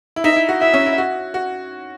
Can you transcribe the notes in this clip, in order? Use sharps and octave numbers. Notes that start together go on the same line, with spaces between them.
E4
D#4 E5
E4
F#4
E4 E5
C#4
E4
F#4
F#4